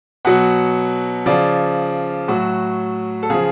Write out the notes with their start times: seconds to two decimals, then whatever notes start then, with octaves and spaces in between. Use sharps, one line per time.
0.25 B2 F#3 F#5
1.26 C#3 F3 D5
2.28 A2 F#3 F#4
3.23 A4
3.30 C#3 F3 G#4